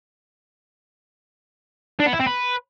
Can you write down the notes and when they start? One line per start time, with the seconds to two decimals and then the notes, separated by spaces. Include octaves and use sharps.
2.00 D4
2.06 B3
2.13 E4
2.20 C4
2.26 B4